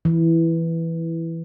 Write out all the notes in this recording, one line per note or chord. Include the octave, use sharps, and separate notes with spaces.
E3